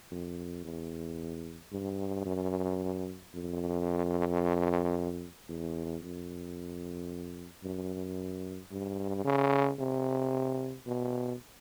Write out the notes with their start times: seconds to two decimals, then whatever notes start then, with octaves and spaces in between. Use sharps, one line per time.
0.12 F2
0.65 E2
1.72 G2
2.26 F#2
3.34 F2
5.49 E2
6.03 F2
7.64 F#2
8.72 G2
9.25 C#3
9.79 C3
10.87 B2